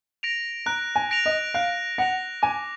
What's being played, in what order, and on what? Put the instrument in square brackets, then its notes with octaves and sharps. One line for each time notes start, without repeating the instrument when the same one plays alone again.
[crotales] A#6 D7 F7
[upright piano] A#5 [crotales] F#6
[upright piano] G#5
[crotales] A#6 D7 F7
[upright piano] D#5
[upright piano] F5 [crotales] F#6
[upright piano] F#5 [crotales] A#6 D7 F7
[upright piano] G#5 [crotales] D6